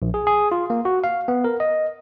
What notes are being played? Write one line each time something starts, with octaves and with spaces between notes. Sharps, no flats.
A#1
G#4
G#4
F4
A#3
F#4
F5
B3
A#4
D#5